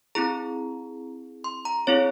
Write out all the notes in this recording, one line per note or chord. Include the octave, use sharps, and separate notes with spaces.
C4 E4 G#4 A#5
C6
A#5
C4 E4 G#4 C#5